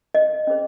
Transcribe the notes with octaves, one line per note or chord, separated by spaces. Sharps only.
D#5
C#4 G#4 C5